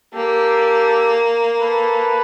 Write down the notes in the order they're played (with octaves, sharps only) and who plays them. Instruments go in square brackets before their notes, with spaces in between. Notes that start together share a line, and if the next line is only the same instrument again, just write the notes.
[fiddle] A#3 [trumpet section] G4 A4
[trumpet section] A4 B4